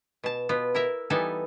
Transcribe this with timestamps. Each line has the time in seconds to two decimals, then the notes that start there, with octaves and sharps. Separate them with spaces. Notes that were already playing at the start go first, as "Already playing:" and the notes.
0.24 B2 A5
0.49 B2 B3 F4
0.75 E4 A#4 E5
1.10 E3 G3 B3 D#4 A4 G#5